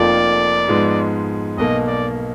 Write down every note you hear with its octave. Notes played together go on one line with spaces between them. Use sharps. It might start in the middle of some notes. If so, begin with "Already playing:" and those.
Already playing: F1 F2 F3 A#3 F4 D5
G#2 F3 G#3 B3
B1 B2 A#3 D#5
D5